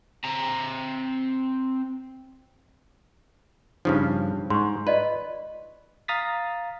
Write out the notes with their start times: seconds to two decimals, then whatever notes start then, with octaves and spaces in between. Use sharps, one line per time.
0.25 C4 A#5
3.85 G2 C#3 F3 D#4
4.50 G#2 C6 C#6
4.87 F4 B4 D5 D#5
6.08 F5 A#5 D#6 A6 B6